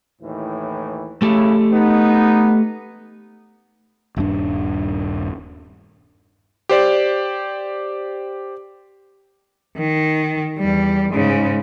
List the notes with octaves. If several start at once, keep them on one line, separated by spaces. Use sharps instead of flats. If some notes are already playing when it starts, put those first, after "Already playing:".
D#2 A2 E3
A2 C#3 A3 E4 G4 A4
B3 D#4
D#1 G2 D4
G4 C5 D5
D#3
E2 G3
G#2 C#3